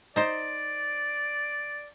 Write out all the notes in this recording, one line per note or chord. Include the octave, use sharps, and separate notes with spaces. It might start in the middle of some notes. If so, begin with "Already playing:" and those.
D#4 C5 D5